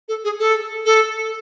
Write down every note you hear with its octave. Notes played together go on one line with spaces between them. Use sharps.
A4
G#4
A4
A4